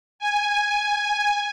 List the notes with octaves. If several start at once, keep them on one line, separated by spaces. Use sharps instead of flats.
G#5